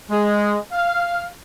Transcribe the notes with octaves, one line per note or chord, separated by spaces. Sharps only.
G#3
F5